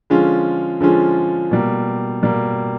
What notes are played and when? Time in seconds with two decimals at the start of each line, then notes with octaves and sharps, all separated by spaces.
0.10 D3 F3 G#3 C#4 F4
0.80 D3 F3 G#3 C#4 F4
1.51 B2 G3 A#3
2.23 B2 G3 A#3